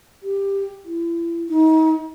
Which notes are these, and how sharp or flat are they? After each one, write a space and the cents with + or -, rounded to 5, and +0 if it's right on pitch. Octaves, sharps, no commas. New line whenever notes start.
G4 +10
E4 +35
D#4 +35